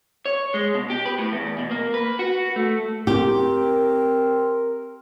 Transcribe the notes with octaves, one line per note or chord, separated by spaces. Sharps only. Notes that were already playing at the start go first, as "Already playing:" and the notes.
C#5
G#3
B2
G4
B4
A2
E2
B2
A#3
B4
F#4
A3
C4 G4 A#4